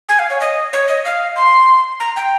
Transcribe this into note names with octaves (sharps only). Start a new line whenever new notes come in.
G#5
F5
C#5
D#5
C#5
D#5
F5
C6
A#5
G5